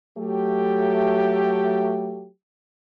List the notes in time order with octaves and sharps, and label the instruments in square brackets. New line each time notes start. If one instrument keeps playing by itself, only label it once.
[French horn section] F#3 A3 G4